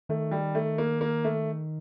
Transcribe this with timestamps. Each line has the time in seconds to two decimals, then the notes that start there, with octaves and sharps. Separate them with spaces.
0.09 D#3 A3
0.31 G3
0.55 A3
0.78 A#3
1.01 A#3
1.24 A3